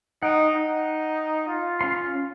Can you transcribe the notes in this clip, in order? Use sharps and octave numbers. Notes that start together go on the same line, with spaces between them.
D#4 F#5 G5
D#4
F4
C#4 F5 C6